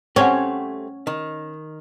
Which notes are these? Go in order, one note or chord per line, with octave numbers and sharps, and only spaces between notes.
A3 C4 C#4 G4 F#5 C#6
D#3